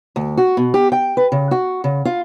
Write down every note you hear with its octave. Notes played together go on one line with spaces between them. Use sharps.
D2
F#4
B2
G4
G5
B4
C#3
F#4
C#3
F4